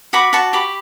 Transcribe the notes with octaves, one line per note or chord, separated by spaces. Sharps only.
F#4 B5 D6
F#4 A5 C#6
G4 B5 D6